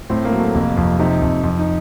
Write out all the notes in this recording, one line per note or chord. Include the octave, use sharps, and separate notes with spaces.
A2 C4
A#3
F#3
A3
F1 A#3
F2
C3 D#4
F2
F2
D#4